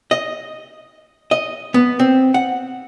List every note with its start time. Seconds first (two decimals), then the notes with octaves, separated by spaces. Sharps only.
0.11 D#5
1.31 D#5
1.74 B3
1.99 C4
2.34 F#5